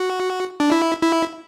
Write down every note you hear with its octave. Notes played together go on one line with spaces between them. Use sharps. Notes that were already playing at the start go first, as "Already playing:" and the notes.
Already playing: F#4
D4
E4
E4